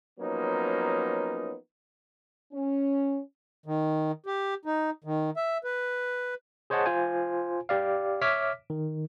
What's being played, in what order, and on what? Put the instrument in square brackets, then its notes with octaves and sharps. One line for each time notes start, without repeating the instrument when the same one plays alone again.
[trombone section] F3 F#3 A#3 B3 C#4 D#4
[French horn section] C#4
[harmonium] D#3
G4
D#4
D#3
E5
B4
[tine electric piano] G#4 C5 C#5 D#5 F#5 A5
F4 C5 G#5
G4 D5 F5
C#5 E5 D6 F6 B6
D#3